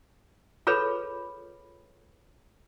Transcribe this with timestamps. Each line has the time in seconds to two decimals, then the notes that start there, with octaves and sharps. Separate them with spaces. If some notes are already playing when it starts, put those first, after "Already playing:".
0.67 F4 G#4 A4 B4 C#5 B5